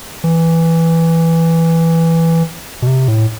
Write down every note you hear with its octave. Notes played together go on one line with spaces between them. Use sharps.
E3
B2
C3
A2